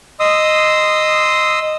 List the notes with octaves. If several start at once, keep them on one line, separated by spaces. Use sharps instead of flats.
D#5 C6 D#6 E6